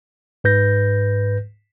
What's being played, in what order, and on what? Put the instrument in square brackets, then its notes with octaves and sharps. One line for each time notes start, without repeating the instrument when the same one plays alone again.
[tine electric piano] G#2 B4 G6 A#6